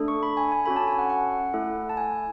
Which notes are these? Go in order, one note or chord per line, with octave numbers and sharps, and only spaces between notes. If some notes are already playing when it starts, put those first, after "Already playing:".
Already playing: A3 D4 A4
C#6
B5
G#5
G#5
C#4 F#4 A4 B5
A5
G#5
F#5
F#5
A3 E4 A4
A5
G#5